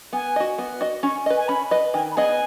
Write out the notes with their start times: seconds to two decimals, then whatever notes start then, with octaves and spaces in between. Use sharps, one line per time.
0.13 B3 G#5
0.36 F#4 D#5
0.58 B3
0.81 F#4 D#5
1.03 C#4 C#6
1.26 B4 D#5
1.37 G#5
1.48 C#4 B5
1.71 B4 D#5
1.94 D#3 G#5
2.12 B5
2.16 B3 G#4 D#5 G#5